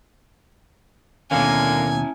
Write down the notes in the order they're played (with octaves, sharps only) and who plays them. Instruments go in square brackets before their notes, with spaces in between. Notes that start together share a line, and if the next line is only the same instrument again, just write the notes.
[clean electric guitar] D#2 B2 [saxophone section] D3 A#3 [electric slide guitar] C#4 E4 [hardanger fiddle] G#5